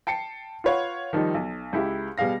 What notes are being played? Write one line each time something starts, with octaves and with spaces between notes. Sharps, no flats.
G5 A5 C7 C#7
F4 B4 C#5 F5 F#5
D#3 F3 G3 D#4
B1
C#2 E4 G4
B2 G3 G#4 F5 A#6